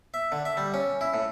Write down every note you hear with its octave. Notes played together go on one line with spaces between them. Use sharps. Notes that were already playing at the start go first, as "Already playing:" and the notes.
E5
D3
E5
G3
C#4
E4
A2